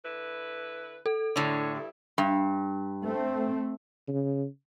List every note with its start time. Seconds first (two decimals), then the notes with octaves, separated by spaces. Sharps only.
0.03 D3 E4 B4
1.06 A4
1.36 A2 D3 G#3 D4 C#5
1.74 G2 E4
2.18 G2
3.03 A3 C4
4.08 C#3